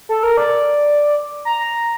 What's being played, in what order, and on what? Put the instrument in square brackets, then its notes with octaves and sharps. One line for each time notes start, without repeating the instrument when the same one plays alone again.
[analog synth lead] A4
A#4
D5
A#5